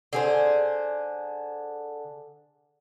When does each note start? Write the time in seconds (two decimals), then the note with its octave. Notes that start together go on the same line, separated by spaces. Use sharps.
0.13 D3 G#4 C5